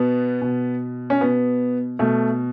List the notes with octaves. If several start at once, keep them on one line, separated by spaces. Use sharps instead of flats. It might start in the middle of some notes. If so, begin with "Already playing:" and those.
Already playing: B2 B3
B2
C#4
B2 B3
B2 A3